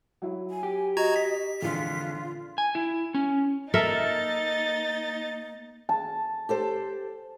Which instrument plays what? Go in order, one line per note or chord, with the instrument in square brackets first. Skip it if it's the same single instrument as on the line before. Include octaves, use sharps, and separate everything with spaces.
[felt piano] F#3 E4 C#5
[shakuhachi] G#5
[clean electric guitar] G4
[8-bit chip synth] F#4 A#5 G#6 [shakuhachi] D#5
[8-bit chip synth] B6
[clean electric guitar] F2 D3 [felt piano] A#2 E3 G#4 [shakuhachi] F4
[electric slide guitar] G#5
E4
C#4
[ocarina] A#3 [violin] D#4 A6 [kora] A4 A#4 E5
[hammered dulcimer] A5
[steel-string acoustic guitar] G4 A4 C5